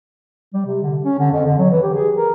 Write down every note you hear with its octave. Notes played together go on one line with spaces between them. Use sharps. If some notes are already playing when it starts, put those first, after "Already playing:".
G3
C3
D3
C#4
D3
F2
D3
F#3
E3
G4
G#4
A#4